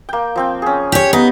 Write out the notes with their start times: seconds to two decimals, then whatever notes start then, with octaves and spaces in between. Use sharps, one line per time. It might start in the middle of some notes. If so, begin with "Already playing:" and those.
0.09 A#3 G5
0.36 F3 C4 G5
0.62 C#4 G#4
0.92 G4 C#5
1.13 B3 D#4